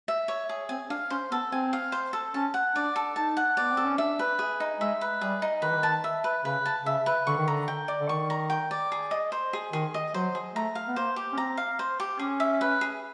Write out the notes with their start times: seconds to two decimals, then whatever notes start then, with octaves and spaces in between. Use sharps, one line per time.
0.08 E5
0.28 C#5
0.49 G#4
0.69 C4 G#5
0.90 D4 F5
1.10 C#4 C5
1.31 B3 A4
1.51 C4 G#5
1.73 F5
1.92 C5
2.13 A4
2.34 C#4 A5
2.54 F#5
2.75 D4 D5
2.96 A4
3.15 D#4 A5
3.37 F#5
3.57 B3 D5
3.72 C4
3.77 A4
3.85 C#4
3.98 D4 E5
4.19 B4
4.39 G#4
4.60 D#4
4.80 G#3 E5
5.01 B4
5.21 G3 G#4
5.42 D#4
5.62 D#3 B4
5.70 E3
5.77 D#3
5.83 A5
6.04 E5
6.24 B4
6.45 C#3 B4
6.66 A5
6.85 C#3 E5
7.06 B4
7.27 D3 C#6
7.38 D#3
7.48 D3 A#5
7.68 G5
7.88 D5
8.01 D3
8.09 D#3 C#6
8.30 A#5
8.50 G5
8.71 D5
8.92 G#4
9.11 D#5
9.32 C5
9.53 G#4
9.73 D#3 G#4
9.94 D#5
10.14 F#3 C5
10.35 G#4
10.55 A3 A#5
10.75 F5
10.88 B3
10.96 A#3 C5
11.16 G4
11.33 C#4
11.38 C4 A#5
11.57 F5
11.79 C5
12.00 G4
12.19 C#4 G#4
12.40 E5
12.61 B4
12.81 G#4